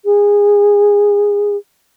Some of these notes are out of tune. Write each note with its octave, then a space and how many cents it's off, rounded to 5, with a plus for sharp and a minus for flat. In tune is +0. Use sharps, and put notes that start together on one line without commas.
G#4 -20